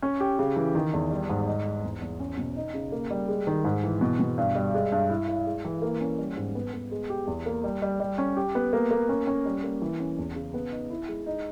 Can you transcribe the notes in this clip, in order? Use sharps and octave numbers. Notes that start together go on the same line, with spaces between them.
C#4
G4
C#3
E3
D#3
E2
G3
G#2
D#4
G#3
E2
E2
C#4
B2
D#4
C#3
A#3
G3
G#3
D#3
G#2
E3
B2
B2
G2
G3
G#3
G2
E4
E4
G#3
E3
A#3
C#4
G3
G#2
B3
B3
G#3
G4
E2
A#3
G3
G3
G3
C#4
G4
B3
A#3
A#3
C#4
C#4
G3
A#3
E3
C#4
E2
C#3
B3
D#4
E4
G#3
D#4